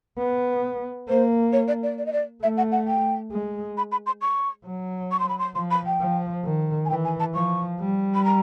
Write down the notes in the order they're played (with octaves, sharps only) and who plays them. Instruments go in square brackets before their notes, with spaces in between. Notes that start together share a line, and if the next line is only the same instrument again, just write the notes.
[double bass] B3
[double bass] A#3 [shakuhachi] C5
[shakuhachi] C#5
D5
D5
D5
D#5
D5
[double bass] A3 [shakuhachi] E5
[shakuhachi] F#5
F#5
G5
[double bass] G#3
[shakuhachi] B5
B5
C6
C#6
[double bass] F#3
[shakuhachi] C#6
C6
B5
C6
[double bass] F3 [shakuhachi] C6
[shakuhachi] B5
G5
[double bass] F3
D#3
[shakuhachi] G#5
[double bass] E3 [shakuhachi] G5
[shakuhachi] G#5
A5
[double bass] F3 [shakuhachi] C#6
[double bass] G3
[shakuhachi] B5
A#5